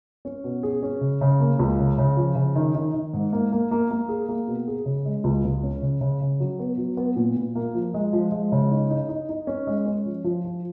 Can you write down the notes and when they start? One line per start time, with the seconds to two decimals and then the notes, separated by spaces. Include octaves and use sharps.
0.25 C#4
0.44 B2
0.63 G#4
0.83 C#4
1.01 C#3
1.21 C#3
1.40 A#3
1.59 C#2
1.79 C#3
1.98 C#3
2.17 F3
2.36 C#3
2.55 D#3
2.75 D#3
2.94 D#3
3.13 G#2
3.33 A#3
3.52 A#3
3.71 A#3
3.90 A#3
4.09 G#4
4.29 A#3
4.48 B2
4.67 G#4
4.86 C#3
5.05 G#3
5.24 C#2
5.44 C#2
5.63 C#4
5.82 C#3
6.01 C#3
6.21 C#3
6.40 F#3
6.59 B3
6.78 F#3
6.97 B3
7.16 A#2
7.36 A#2
7.55 A#3
7.74 F3
7.94 G#3
8.13 F3
8.32 G#3
8.52 C#3
8.71 D#4
8.90 D#4
9.09 D#4
9.29 D#4
9.47 C#4
9.67 G#3
9.85 C#4
10.05 F3
10.24 F3
10.44 F3